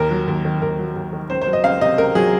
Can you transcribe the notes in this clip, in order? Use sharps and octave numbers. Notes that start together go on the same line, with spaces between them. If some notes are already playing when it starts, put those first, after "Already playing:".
Already playing: D#2 A#4
F#3
D#2
D#3
D#2 A#4
F#3
D#2
D#3
C#2 C5
C5
F#3
D#5
C#2 F5
C3 D#5
C#2 A#4
F#3 G#4